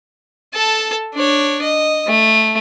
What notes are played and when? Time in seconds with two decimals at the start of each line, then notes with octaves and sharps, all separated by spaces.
0.53 A4 A5
1.14 D4 C#5
1.62 D#5
2.07 A3